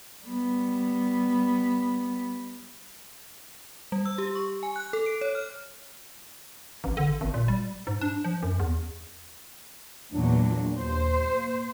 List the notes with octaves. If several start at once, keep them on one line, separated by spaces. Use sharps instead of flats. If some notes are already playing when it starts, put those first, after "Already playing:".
G3 B3
G3
E6
G4
C#6
G#5
F#6
A4
D7
C#5
F6
A1
D3
G#1
A#2
G3
G#2
D4
F3
F#2
E2
E2 A#2 F#3 D4
D#2 C5
A#3